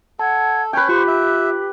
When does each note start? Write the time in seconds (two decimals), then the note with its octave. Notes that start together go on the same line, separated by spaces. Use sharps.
0.19 A4 F#5 A5 G#6
0.73 C#4 B4 C#5 G5
0.89 F4 G4 C5 C#6
1.08 E5